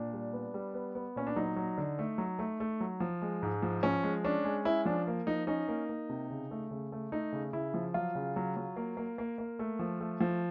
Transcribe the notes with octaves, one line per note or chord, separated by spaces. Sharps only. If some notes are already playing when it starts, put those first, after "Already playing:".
Already playing: A#2 D4
G3
B3
G3
B3
B3
A#2 C#4
D4
F#3 D#4
F#3
D3
A3
F#3
A3
A3
F#3
F3
G#3
G#2
F3
F3 C#4
G#3
C#4 D4
G#3
C#4 E4
F3 D4
A#3
F3 D#4
C#4 D#4
A#3
A#3
C3
C#3
A3
C#3
A3
A3 D#4
C#3
C#3 E4
F3
F#3 F4
C#3
F#3
F#3
A#3
A#3
A#3
A#3
A3
F3
A3
F3